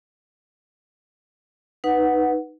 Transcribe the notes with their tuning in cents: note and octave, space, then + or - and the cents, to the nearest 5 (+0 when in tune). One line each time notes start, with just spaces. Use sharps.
D#4 -5 B4 +0 F#5 +0